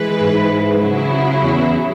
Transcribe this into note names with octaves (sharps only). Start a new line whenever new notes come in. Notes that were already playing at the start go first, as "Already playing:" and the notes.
Already playing: E3 G#3 E4 B4
G#2
C#3 F#3 E4
E2